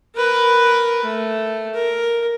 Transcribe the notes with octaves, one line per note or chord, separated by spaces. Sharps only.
A#4 B4
A3
A#4